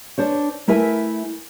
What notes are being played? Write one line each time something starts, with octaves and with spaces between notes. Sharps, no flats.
D4 C5 C#5
A3 E4 A#4 E5 G#5